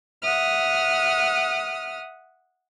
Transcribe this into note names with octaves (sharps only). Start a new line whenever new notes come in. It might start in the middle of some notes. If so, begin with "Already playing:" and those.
E5 F#5 D#6 F6